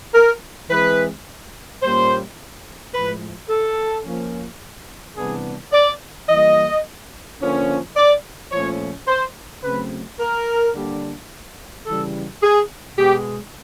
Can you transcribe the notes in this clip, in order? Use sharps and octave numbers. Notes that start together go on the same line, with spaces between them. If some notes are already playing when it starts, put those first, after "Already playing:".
A#4
E3 G#3 C4 B4
A#2 G3 A#3 C#4 C5
A2 F3 G#3 B4
A4
F3 A#3 C#4
C3 E3 G3 B3 D4 G#4
D5
E3 G3 A#3 D#5
D3 F3 A#3 C#4
D5
A#2 F3 A3 C#4 C#5
C5
C#3 F#3 A3 C4 B4
A#4
D3 G3 A#3 D4
C#3 E3 G3 A4
G#4
B2 G#3 B3 G4